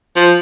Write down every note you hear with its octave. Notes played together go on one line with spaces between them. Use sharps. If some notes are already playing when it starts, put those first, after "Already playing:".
F3